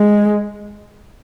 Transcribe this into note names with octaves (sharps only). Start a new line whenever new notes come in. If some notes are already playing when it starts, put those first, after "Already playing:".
Already playing: G#3